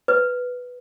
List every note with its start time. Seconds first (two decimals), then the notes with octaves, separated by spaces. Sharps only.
0.08 B4